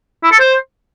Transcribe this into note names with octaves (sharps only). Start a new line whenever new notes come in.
E4
A4
C5